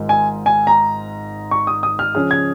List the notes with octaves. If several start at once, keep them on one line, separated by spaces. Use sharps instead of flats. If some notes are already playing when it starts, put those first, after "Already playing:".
Already playing: G#1 G#2 G#3 F4 A#4
G#5
G#5
A#5
C#6
D#6
D#6
F6
C#3 F3 C#4 G#4 F6
G#6